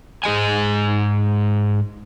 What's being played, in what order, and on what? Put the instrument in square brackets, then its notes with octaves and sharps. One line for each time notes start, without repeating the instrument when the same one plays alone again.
[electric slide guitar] G#2 G#4 D#5 G#5